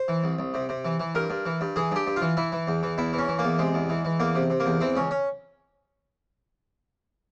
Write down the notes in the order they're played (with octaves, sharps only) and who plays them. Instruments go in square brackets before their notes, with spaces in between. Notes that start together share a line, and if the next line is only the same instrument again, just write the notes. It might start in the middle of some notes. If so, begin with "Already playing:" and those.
Already playing: [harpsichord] C5
E3
C2
C2
C3
C3
E3
E3
G2 A#4
G2
E3
G2
E3 G#4
G2 G4
G2
F4
E3
E3 E4
E3
E2
E3
E2 E4
E3
C#4
E3
E2 A#3
C3 G#3
E2
E3
E3
E2 A#3
C3
C3
A#3
E2
E3 C4
C#2 C#4
C#4